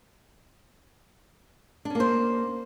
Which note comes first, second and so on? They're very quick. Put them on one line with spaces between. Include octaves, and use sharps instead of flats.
D4 C#4 A#3 C5